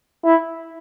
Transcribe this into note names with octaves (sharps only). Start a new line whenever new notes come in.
E4